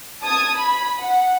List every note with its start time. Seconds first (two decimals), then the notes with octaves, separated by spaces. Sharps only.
0.22 A5 D#6 G#6
0.54 B5
1.00 F#5